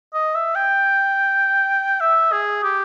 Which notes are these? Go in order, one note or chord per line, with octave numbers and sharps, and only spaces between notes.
D#5
E5
G5
E5
G#4
G4